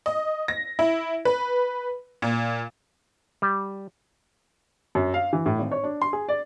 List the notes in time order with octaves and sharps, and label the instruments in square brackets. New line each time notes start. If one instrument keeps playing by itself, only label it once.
[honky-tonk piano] D#5
A#6
E4
B4
A#2
[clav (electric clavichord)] G3
[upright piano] F#2
F5
E3
A2
G#1
C#5
D4
C6
G#4
D5